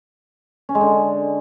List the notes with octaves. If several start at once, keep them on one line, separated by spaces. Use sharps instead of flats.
C#4
G#3
D3